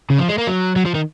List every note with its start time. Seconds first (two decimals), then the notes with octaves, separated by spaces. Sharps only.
0.10 C#3
0.19 F3
0.29 G#3
0.38 A#3
0.47 F#3
0.76 F#3
0.85 F3
0.95 D#3